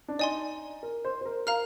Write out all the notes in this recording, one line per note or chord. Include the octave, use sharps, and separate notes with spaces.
D4
D#4 D5 G#5 C6
A#4
C5
C5
A#4
A#4 F5 A#5 F6